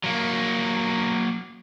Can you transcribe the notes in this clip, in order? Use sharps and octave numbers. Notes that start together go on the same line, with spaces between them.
F#3 A#3